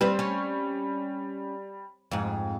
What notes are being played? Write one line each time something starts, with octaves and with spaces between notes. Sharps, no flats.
G3 C4 B4
C#4
F2 G#2